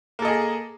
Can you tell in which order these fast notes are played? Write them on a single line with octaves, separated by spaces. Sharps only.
A#3 A4 D#5 G#4